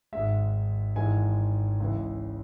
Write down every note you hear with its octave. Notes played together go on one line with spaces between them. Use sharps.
G#1 G#2 G#3 E5
G#1 G#2 E3 G#3 G#5
C#2 C#3 E3